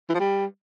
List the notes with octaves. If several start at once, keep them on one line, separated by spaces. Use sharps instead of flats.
E3
F3
G3